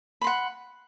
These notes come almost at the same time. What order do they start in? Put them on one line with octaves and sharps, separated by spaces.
B5 C6 F#5